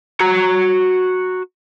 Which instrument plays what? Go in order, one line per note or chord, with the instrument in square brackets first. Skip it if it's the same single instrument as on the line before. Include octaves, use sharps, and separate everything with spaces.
[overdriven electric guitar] F#4 A#5